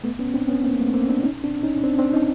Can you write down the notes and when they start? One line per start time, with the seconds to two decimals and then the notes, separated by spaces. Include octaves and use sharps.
0.04 A3 B3
0.19 B3 C#4
0.34 C4 D4
0.48 B3 C#4
0.64 A#3 C4
0.74 A#3
0.79 A3 B3
0.94 A#3 C4
1.09 C4 D4
1.23 C#4 D#4
1.44 C4 D4
1.63 C#4 D#4
1.84 C4 D4
1.98 C4 D4
2.13 C#4 D#4